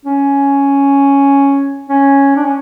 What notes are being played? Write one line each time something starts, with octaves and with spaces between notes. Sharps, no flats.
C#4
C#4
D4
C#4